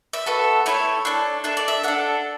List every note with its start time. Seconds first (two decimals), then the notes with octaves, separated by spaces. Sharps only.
0.13 E5
0.26 B3 F#4 A4
0.66 A3 E4 A4 C#5
1.05 D4 A4
1.44 D4 A4 E5
1.57 D5
1.68 E5
1.83 D4 A4 F#5